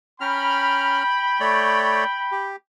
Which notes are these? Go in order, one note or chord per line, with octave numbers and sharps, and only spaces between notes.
C#4 G5 A#5 B5 F6
A3 C#5 D5
G4